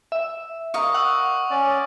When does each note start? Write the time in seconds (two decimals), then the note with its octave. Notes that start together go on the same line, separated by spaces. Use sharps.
0.12 E5
0.74 A#4 D#5 F5 C#6
0.94 F#5 C#6 D#6 E6
1.51 C#4 D5